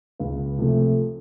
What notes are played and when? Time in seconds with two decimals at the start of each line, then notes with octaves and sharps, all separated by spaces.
0.20 C#2
0.58 C3 F3 A3